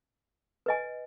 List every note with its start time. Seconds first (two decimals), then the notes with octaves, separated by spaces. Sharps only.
0.66 B4 D#5 G#5